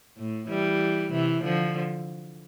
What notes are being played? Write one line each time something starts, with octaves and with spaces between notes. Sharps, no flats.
A2
E3 G3
C3 E3
D3 F3